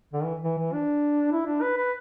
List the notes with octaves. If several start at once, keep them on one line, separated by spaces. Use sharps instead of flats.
D3
E3
E3
E3
D4
E4
D4
B4
B4